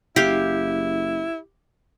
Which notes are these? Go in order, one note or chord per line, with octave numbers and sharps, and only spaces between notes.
F#1 E4 G4 F5